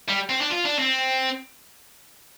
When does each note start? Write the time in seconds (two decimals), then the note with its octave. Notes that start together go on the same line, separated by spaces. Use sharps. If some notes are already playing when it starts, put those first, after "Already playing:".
0.09 G3
0.30 C4
0.41 D4
0.50 F4
0.65 D4
0.79 C4